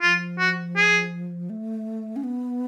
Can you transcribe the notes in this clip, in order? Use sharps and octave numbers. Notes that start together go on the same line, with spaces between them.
F3 F4
F#4
G#4
A3
C#4
B3